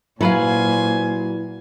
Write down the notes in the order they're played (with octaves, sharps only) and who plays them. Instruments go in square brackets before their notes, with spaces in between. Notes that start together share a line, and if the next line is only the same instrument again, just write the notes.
[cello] A#2 [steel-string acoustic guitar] F#3 [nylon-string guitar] E4 B4 F5 [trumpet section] C5 G#5